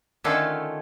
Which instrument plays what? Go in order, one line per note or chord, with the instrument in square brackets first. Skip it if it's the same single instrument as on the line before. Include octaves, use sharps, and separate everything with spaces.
[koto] D3 D#3 A3 C#4 F4 A4